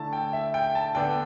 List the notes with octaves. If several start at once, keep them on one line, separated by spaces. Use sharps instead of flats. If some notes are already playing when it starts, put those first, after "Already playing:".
Already playing: D3 A3 E4 A5
G5
E5
G5
A5
D3 B3 D4 G5